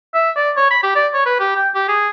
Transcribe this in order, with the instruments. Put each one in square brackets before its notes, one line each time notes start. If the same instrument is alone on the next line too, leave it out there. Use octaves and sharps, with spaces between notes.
[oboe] E5
D5
C#5
B5
G4
D5
C#5
B4
G4
G5
G4
G#4